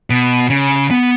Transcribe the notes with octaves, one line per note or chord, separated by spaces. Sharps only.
B2
C#3
B3